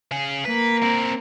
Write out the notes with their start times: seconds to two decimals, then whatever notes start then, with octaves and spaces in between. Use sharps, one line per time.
0.11 C#3 G#4
0.45 A#3 B4
0.83 C4 A#4